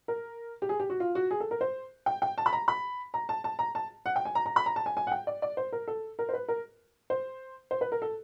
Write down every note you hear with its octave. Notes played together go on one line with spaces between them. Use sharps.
A#4
G4
G#4
G4
F#4
F4
F#4
G#4
A4
A#4
C5
G5
G5
A5
B5
A#5
B5
A#5
A5
A5
A#5
A5
F#5
G5
G#5
A#5
A#5
B5
A#5
A5
G#5
G#5
F#5
G5
D5
D5
C5
A#4
A4
A#4
C5
B4
A#4
C5
C5
B4
A#4
A4